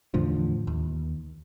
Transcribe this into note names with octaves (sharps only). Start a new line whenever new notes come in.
E2 A2 D3 F3
D#2